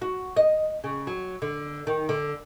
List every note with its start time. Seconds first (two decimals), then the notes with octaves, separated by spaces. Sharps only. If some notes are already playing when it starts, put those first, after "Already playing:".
0.02 F#4
0.37 D#5
0.84 C#3
1.07 F#3
1.42 D3
1.87 D#3
2.09 D3